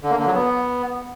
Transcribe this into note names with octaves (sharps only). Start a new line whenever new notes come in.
D3
A#3
D3
F#3
B3